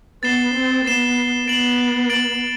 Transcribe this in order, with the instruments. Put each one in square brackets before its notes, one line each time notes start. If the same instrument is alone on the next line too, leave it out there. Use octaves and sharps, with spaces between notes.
[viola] B3 [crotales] A6 C7 E7 G7
[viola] C4
[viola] B3 [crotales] A6 C7 E7 G7
[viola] B3 [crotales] A6 D7 F#7
[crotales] A6 D7 F#7